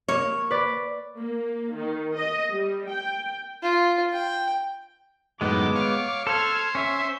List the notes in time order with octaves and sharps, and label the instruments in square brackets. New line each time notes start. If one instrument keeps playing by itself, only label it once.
[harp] A#3 [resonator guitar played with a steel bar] C#5
[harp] B4 D5
[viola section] A#3
D#3
D#5
G3
G5
[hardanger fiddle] F4
G5
[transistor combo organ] F#2 A2 D#3 [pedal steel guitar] G#3 B3 [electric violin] D6
[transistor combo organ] C#5 F5
[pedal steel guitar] A4 [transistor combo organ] C5 [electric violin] F6 G#6
[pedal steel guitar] C#4 [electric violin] E5